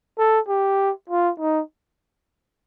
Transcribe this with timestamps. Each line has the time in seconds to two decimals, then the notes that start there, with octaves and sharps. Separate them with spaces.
0.18 A4
0.48 G4
1.09 F4
1.40 D#4